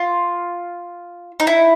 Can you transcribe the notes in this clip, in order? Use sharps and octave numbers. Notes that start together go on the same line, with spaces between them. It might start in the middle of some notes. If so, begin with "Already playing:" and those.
Already playing: F4
D#4
E4